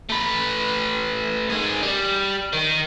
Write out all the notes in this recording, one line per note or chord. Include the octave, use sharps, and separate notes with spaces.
A3 B4
D#3 G#4
G3
D#3